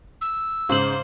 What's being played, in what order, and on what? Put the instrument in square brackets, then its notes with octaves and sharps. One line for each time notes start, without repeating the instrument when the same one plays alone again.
[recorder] E6
[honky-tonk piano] G#2 C#3 F#7 [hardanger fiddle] C5